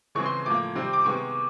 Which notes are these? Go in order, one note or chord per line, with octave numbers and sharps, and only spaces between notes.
C#3 E3 G#3 C4 C#6
C6
A2 F3 A#3 D6
C3 D#3 G3 C4
D6
C3 D#3 G#3 B3 C#6